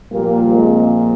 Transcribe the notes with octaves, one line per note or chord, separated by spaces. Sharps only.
A#2 F3 G3 A#3
G#3 C4